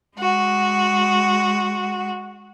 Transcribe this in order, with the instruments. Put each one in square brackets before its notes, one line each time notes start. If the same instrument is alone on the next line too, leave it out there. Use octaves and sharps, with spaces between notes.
[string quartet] G#3 F#4